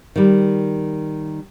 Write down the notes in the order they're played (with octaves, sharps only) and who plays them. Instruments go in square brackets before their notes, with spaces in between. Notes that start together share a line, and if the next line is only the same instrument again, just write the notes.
[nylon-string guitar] D#3 G3